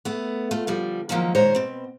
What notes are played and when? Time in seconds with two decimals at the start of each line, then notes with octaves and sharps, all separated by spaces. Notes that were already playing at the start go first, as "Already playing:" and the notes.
0.05 A3 B3
0.51 A3 F4
0.67 D3 F3 G3
1.09 D#3 F3 F#3 G#3 A#3 C#4
1.35 A#2 D#3 G#3 C5 C#5 A#5
1.55 B2 C4